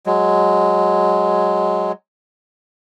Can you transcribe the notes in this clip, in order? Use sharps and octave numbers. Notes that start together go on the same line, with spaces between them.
F#3 G#3